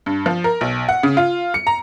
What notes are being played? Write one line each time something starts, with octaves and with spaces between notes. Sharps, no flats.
G2
F3
A#4
B1
F#5
C#3
F4
C#7
A#5